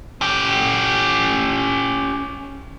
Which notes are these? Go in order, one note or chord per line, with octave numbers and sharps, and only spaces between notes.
C#4 G4